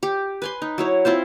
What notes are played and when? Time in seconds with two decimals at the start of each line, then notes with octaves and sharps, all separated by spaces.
0.03 G4
0.42 B4 G#5 C6
0.62 D#4
0.78 F#3 E4 C#5
1.05 C4 E4 F4 C5